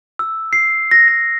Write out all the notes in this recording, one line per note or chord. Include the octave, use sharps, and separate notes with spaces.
E6
C7
A#6
A#6